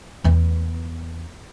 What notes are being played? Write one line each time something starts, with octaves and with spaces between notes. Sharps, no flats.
E2 B3